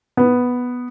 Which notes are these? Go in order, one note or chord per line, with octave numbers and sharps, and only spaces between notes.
B3